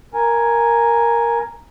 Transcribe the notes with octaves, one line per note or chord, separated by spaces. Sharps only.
A#4 G#5